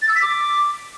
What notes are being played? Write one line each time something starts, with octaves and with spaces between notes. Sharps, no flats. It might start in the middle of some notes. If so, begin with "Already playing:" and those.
A6
E6
B6
D6